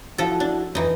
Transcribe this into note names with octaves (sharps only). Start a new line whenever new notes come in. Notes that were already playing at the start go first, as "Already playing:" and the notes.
F3 E4 F#4 A4
D4
F2 E3 D#4